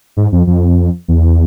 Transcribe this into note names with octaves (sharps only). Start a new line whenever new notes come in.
G#2
F2
F2
E2